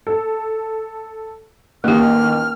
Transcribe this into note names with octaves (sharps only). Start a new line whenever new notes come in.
A4
A1 D#2 A#3 G4 F6